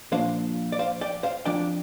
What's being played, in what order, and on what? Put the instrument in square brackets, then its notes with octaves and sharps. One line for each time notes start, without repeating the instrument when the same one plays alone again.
[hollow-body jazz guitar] A#2 F3 D4 C5 F5
D5
C5 F5
D5 G5
C5 F5
F2 F3 D4 D5 G5